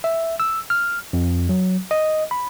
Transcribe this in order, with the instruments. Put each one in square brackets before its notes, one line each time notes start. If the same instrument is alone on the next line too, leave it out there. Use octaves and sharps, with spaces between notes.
[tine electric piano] E5
E6
F6
F2
F#3
D#5
B5